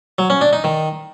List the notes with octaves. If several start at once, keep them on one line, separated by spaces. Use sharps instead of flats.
F#3
C#4
D4
D#4
D#3